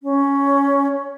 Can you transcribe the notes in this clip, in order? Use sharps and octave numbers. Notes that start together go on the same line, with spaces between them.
C#4